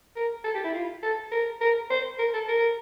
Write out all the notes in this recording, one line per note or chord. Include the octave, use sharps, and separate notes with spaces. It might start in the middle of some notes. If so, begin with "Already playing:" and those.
A#4
A4
G4
E4
F4
A4
A#4
A#4
C5
A#4
A4
A#4